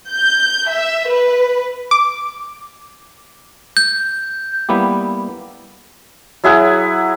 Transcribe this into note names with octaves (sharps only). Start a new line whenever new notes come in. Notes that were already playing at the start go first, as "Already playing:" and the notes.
G6
E5
B4
D6
G6
G3 A#3 B3 E4 G4
F#3 E4 G#4 F#5